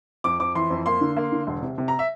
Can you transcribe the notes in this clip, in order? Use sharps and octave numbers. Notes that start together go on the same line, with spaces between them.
F2 D6
F2 D6
E3 C6
F2
A#3 C6
D3
A#3
D3
E1
C3
C3
A#5
E5